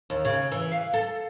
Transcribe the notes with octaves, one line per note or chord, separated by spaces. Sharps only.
D#2
C#3
E3
F5
A4